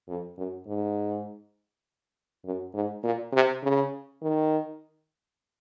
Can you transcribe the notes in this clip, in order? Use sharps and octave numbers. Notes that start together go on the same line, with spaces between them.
F2
F#2
G#2
F#2
G#2
A#2
C3
C#3
D#3